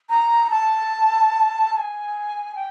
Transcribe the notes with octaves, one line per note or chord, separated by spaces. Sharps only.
A#5
A5
A5
G#5
G5